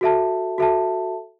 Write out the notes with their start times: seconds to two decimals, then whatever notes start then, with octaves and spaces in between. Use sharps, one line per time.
0.01 F#4 A4 E5 A5
0.58 F#4 A4 E5 A5